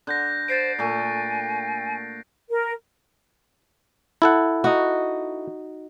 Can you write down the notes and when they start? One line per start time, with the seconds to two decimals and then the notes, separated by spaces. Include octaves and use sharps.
0.07 D3 F#6 G6 A#6
0.48 C5 A6 C7 D7
0.79 A#2 A3 G#5
2.50 A#4
4.22 E4 A4 F#5
4.64 D#4 F#4